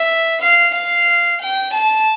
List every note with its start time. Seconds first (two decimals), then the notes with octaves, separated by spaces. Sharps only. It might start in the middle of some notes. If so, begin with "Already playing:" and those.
Already playing: E5
0.41 F5
0.74 F5
1.41 G5
1.73 A5